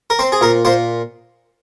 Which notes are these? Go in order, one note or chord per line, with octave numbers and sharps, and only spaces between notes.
A#4
C4 C5
G#4
A#2 A#4
A#2 C5